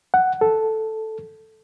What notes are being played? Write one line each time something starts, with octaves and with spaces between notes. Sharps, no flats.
F#5
A4